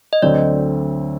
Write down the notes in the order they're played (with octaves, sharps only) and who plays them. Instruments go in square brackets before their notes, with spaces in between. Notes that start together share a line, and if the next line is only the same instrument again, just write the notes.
[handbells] D#5
[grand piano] D2 D3 F#3 C4 [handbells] D5